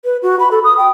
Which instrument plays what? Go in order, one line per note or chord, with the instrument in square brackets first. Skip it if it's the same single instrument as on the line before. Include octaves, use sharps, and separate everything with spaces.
[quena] B4
F#4
B5
A4
D#6
G5